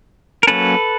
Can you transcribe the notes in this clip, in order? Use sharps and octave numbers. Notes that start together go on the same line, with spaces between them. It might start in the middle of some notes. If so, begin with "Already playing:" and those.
A#4
F#3 A#3 C#4 A4 B4